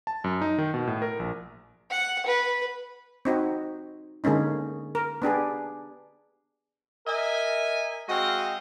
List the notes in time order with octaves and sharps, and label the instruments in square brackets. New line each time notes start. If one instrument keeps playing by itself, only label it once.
[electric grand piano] A5
F#2
D#4
D#3
B2
A2
A#4
A#1
[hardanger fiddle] F#5
B4
[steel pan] C4 D#4 F#4
D3 G#3 A#3 C#4 D#4
A#4
B3 D4 G4 G#4
[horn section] A#4 D#5 E5 G#5
G#3 C4 F#4 D#5 F5